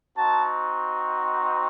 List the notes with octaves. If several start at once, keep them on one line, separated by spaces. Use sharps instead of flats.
C4 D#4 F#4 A5